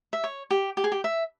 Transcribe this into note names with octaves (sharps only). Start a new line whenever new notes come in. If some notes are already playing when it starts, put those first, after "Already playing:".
E5
C#5
G4
G4
G#4
G4
E5